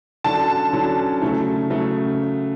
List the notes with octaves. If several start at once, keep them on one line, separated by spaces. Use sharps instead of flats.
D3 F#3 C#4 A5
D3 F#3 C#4
C#3 F#3 A3
C#3 F#3 A3